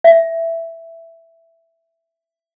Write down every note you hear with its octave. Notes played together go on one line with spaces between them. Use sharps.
E5